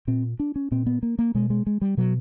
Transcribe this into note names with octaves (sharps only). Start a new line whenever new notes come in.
A#2 C4
D4
C#4
A#2 C4
B3
A#3
A#3
B2 G#3
G#3
G#3
G3
B2 F#3